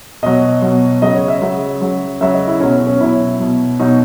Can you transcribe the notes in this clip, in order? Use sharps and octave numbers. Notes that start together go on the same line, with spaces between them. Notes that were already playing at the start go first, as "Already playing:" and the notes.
B2 F#3 D#5
B2 F#3
C#3 F#3 D#5
C#5
E5
C#3 F#3
C#3 F#3
C#3 F#3 E5
D#5
E4
B2 F#3 C#4
C#4
B2 F#3 E4
B2 F#3
B2 F#3 D#4